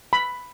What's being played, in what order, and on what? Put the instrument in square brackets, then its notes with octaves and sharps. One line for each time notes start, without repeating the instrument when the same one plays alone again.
[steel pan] B5